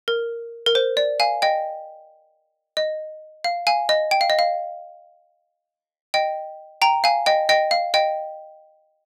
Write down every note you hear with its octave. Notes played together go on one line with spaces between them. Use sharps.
A#4
A#4
C5
D5
F5 G#5
D#5 G5
D#5
F5
F5 G#5
D#5
G5
F5
D#5
F5
D#5 G5
G5 A#5
F5 G#5
D#5 G5
D#5 G5
F5
D#5 G5